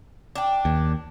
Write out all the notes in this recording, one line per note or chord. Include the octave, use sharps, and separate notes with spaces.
D4 G5
D#2